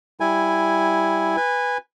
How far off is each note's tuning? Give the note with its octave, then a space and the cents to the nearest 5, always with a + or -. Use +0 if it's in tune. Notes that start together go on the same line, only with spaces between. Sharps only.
G3 +0 E4 +0 G#5 -5
B4 +0 G#5 -20